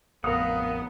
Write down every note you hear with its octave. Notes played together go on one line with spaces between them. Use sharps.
A1 F2 B3 A#4 D#5 F5 F#5 D#6